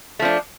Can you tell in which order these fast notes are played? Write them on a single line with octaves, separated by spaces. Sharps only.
A3 F3 D4